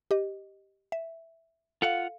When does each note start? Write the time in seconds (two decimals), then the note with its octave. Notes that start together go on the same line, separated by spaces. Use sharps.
0.11 G4 D#5
0.92 E5
1.82 F4 A4 F5 F#5